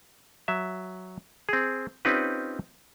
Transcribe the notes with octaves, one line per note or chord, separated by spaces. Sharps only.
F#3 E5
C4 G#4
C4 C#4 D#4 F4 G4 B4